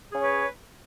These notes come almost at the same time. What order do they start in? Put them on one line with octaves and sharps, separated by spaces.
G#4 C#4 C#5 B4